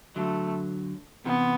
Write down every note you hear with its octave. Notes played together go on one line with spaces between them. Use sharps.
D3 F#3 A3
C3 E3 B3